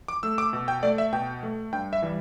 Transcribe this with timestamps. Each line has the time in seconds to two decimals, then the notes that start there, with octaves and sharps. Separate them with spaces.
0.08 D6
0.23 A3 E6
0.38 D6
0.53 B2
0.68 G5
0.83 A3 D5
0.98 E5
1.13 B2 G5
1.43 A3
1.72 G2 G5
1.93 E5
2.02 E3 G3